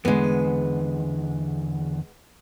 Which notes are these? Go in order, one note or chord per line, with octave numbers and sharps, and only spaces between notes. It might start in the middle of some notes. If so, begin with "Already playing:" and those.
E2 D3 G#3 B3